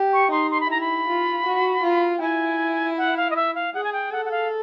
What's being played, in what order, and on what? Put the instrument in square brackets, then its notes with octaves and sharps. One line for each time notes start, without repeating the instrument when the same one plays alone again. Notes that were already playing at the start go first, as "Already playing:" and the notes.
Already playing: [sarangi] G4
[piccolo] C#6
[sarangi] D#4 [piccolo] C6
[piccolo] C6
B5
[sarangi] E4 [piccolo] A#5
[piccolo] B5
[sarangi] F4
F#4
F4
[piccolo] G5
[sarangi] E4 [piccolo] G#5
[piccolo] F#5
F5
D#5
E5
F5
[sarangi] G#4 [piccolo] F#5
[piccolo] G#5
G5
[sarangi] A4 [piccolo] F#5
[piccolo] F#5
F5